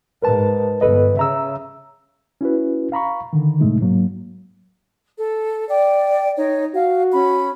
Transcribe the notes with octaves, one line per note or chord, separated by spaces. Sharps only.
G#2 A#4 B4 A5
G1 A4 B4 D#5
C#3 E5 A#5 E6
C#4 E4 F#4 B4
F5 A#5 B5 C#6
D3 D#3
F#2 A2 C3 G#3 A3 D#4
G#2 F#3 A#3
A4
D5 G5
D#4 C#5
F#4 F5
C#4 B5